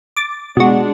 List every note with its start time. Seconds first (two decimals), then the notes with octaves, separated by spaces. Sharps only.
0.16 D6 A6
0.57 B2 G#3 D4 F#4